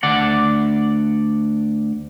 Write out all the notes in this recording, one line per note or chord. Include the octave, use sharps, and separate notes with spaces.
D2 D5 F#5